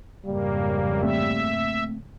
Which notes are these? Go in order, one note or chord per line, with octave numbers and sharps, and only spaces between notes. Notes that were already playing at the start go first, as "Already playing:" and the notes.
F2 G#2 C#3 G3 A#3
A3 A#3 C4 E5